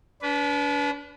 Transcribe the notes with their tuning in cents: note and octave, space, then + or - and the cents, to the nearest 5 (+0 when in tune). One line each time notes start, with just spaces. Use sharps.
D4 -40 B4 +0